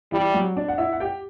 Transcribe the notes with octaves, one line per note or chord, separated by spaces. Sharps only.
E3 G3 E4
F#3 F#4
D4 D5
F#5
E4 E5
F#5
G4 G5